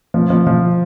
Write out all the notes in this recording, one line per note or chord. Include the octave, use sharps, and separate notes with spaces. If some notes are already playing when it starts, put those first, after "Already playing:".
F3
F3
F3